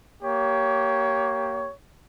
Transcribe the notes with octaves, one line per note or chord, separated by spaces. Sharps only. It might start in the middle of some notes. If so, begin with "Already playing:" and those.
A#3 G4 C#5